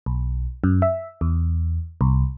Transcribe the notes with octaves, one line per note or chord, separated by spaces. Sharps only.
B1
F#2
E5
E2
C2